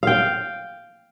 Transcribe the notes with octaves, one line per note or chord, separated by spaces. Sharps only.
F5 G5